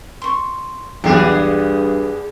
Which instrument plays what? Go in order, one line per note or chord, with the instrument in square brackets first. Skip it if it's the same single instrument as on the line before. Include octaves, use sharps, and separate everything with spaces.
[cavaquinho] C6 C#6
[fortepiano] B1 E2 [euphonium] G2 [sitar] B3 D4 G#4 [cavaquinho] G4